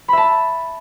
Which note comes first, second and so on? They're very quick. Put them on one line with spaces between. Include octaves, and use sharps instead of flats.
B5 E5 A5